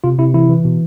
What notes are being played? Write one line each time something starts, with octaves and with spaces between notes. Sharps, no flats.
C3 F4
C3 E4
E3 E4
E3
B2